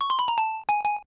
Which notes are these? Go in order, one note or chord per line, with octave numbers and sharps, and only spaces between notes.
C#6
C6
B5
A#5
A5
G#5
G#5